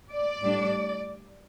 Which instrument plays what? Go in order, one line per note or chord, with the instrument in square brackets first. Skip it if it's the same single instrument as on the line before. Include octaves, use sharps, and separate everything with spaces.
[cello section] D5
A2 G3 D4